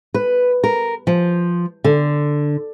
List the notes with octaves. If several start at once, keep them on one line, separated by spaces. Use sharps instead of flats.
B4
A#4
F3
D3